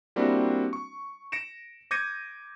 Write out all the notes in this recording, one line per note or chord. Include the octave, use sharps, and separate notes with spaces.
G3 A#3 C4 D4 E4 F#4
C#6
A#6 C#7 D7 E7
D6 G6 G#6 A#6 C#7 D#7